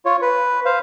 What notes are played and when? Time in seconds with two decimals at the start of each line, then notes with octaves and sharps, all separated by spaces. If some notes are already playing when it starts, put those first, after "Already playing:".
0.05 F4 C#5
0.22 B4
0.65 C5 F5